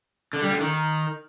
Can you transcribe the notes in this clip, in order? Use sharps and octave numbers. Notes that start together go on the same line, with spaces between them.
D3
G3
D3
D#3